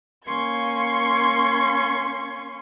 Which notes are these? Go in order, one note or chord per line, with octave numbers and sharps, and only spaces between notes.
A#3 C#4 C6 C#6 G#6